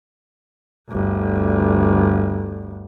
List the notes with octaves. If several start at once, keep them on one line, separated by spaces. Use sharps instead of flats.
G1 D2